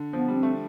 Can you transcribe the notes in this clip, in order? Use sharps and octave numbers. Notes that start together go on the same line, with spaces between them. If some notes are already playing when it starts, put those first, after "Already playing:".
Already playing: D3
F3 B3
G3
C4
A3